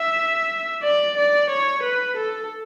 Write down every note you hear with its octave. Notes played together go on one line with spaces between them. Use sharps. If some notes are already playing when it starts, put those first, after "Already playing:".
Already playing: E5
D5
D5
C#5
B4
A4